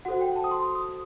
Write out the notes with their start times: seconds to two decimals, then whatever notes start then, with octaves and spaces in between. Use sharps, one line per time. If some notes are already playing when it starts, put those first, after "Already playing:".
0.05 F#4 A4 C5 F#5
0.21 G5
0.36 A5
0.44 D#6
0.51 C6
0.75 D#6